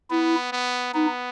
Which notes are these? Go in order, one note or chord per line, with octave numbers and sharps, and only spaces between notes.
B3 E4
B3
B3 D#4